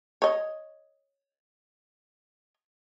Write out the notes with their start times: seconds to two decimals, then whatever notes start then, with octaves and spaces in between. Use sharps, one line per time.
0.22 C#5 D#5